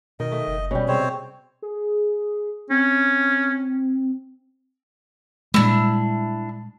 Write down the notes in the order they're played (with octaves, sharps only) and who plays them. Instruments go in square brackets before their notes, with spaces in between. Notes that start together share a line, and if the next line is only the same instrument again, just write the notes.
[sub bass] B2 [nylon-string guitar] D#3 [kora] A#4 [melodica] D#5
[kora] A3
[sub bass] F#1
[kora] B2 G3 [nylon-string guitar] C#4
[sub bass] C3 [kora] G#3 [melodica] C4 C5 C#5
[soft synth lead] G#4
[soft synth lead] C4 [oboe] C#4
[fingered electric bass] A#2 G3 G#3 [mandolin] D4 E4